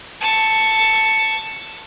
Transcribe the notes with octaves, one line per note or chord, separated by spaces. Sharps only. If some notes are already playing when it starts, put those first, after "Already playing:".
A5 C#6